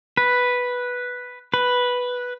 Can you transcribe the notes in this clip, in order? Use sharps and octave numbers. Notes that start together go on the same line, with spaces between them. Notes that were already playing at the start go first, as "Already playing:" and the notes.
B4
B4